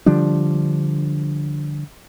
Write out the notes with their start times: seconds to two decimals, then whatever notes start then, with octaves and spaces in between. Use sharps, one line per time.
0.06 D3 F3 G3 D4